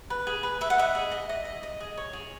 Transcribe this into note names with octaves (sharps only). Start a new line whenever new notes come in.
B4
G#4
B4
B4 E5
F#5
D#5 E5
G#4
D#5
D#5
D#5
D#5
G#4
C#5
G#4